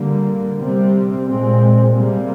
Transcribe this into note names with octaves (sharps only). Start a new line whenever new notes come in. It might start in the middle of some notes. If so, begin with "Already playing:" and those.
Already playing: D3 G3 A#3
C3 G3 C4
A#2 G#3 C4
C3 G3 A#3